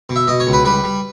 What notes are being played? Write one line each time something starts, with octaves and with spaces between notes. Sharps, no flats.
B2
E5
B2 D#5
C#5
C#2
B4
G3 B4
G3